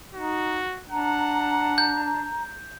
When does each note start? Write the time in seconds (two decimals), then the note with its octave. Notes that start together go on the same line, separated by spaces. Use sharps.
0.15 D#4 F#4
0.90 D4 F#5 A#5
1.78 G6